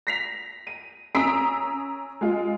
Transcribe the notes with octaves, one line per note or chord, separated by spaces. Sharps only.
A#6 B6 F7
D#7
C#4 A#5 D#6 E6 B6 D7
G#3 F4